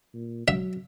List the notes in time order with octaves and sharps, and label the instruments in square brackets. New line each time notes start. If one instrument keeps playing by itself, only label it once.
[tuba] A#2
[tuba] F#3 [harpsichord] E5